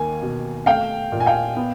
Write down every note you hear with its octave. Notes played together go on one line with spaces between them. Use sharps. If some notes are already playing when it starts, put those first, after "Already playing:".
Already playing: D#2 A#3 G#5
B2
A3 F5 G5
A#2
G#5
F5 G5
B3